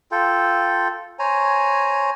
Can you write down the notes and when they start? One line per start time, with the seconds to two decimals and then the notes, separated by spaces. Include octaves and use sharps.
0.11 F4 A4 G5
1.19 C5 C#5 G#5 A#5